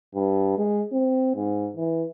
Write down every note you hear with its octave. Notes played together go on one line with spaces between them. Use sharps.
G2
G#3
C4
G#2
E3